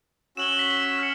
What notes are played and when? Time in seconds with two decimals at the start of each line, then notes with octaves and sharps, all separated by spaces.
0.37 C#4 F#4 E6 E7 F#7 G7
0.59 B6
0.99 F6 C#7